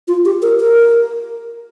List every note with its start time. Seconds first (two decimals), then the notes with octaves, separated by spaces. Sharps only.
0.08 F4
0.25 G4
0.42 A#4
0.60 A#4